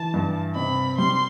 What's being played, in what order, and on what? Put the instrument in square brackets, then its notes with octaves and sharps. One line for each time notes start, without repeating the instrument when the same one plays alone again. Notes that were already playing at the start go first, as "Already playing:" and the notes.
Already playing: [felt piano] E3 [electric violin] A5
[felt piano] G2
[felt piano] C3 [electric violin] B5
[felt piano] G3 [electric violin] C6